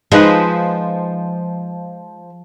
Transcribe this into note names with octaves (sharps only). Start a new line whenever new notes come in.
F3 G#3 D#4 B4